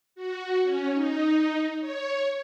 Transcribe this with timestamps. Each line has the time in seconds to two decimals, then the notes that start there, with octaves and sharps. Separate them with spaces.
0.15 F#4
0.63 C#4
0.94 D#4
1.80 C#5